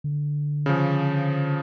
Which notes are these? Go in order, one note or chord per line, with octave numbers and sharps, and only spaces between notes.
D3
C#3 F3